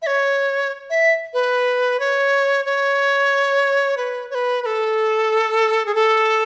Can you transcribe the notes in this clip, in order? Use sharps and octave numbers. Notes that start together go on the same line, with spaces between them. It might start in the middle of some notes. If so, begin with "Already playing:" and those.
E5
C#5
E5
B4
C#5
C#5
B4
C#5
B4
B4
A4
G#4
A4